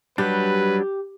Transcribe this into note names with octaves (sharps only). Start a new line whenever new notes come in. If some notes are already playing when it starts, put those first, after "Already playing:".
F#3 G3 D4 G4 B4